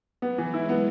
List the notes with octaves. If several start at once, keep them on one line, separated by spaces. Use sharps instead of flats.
F#3 B3
E3
G#3 E4
B3